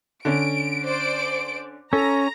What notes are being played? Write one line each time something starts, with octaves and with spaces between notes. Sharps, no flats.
D3 C#4 D7
C5 D5 D7
C#4 A4 A#5